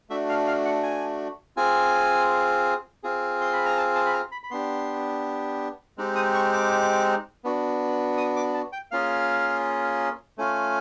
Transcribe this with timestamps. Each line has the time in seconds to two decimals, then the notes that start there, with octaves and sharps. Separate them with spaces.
0.10 A3 D4 F#4 E5
0.29 F5
0.47 F5
0.65 F#5
0.83 G#5
1.57 C4 F4 G#4 G#5
3.03 C4 F4 G#4
3.41 C6
3.53 B5
3.66 A#5
3.77 A5
3.95 A5
4.06 B5
4.13 A#5
4.32 B5
4.44 B5
4.51 B3 D4 G4 C6
5.98 G#3 C4 D#4 G4
6.15 D#6
6.35 C#6
6.53 D6
7.44 B3 D4 F#4
8.17 D#6
8.36 D6
8.54 A5
8.73 G5
8.91 A#3 C#4 F4 G#4 F5
10.38 A3 C#4 F4